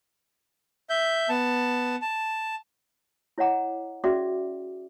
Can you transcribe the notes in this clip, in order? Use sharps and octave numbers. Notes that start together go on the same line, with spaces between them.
E5 G6
B3 A5
A5
E4 C#5 D#5 F#5 A#5 D6
C#4 F#4 G#4 D5 E5 D6